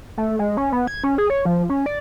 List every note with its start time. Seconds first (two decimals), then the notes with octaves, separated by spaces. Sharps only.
0.18 A3
0.39 G#3
0.57 C#4
0.72 B3
0.87 G#6
1.04 C#4
1.18 G#4
1.30 C#5
1.45 F3
1.70 C#4
1.86 D5